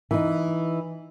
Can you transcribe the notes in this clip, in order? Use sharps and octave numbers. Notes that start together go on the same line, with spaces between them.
E3 D#4